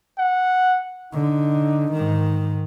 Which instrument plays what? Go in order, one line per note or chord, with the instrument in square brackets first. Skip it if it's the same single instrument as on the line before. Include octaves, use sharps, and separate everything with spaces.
[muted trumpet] F#5
[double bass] D3 [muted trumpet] D#4
[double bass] G#2 D#3